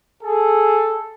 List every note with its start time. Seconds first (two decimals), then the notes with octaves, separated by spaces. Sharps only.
0.23 G#4 A4